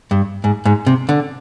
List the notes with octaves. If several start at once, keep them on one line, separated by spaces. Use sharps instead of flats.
G2
G#2
G#2
C3
D3